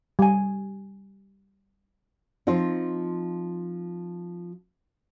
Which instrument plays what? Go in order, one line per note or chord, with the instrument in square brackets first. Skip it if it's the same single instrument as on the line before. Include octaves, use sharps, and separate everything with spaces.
[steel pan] G3 G#5
[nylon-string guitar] F3 C4 D#4 F4